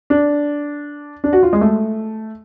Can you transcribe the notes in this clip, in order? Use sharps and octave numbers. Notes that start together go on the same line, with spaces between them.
D4
D4
F#4
F4
G#3
A3